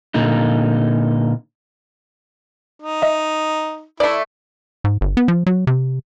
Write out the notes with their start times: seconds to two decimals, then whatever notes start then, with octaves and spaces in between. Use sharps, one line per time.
0.14 A#2 D3 D#4
2.81 D#4
3.02 D#5 E5
4.00 A3 E4 D5
4.84 G#2
5.01 G1
5.17 B3
5.28 F3
5.46 F#3
5.67 C3